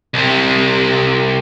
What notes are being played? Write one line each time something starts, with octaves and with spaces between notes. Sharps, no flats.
C2 C3